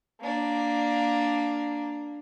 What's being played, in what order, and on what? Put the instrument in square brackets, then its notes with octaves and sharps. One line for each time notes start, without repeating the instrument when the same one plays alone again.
[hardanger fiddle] A#3 D4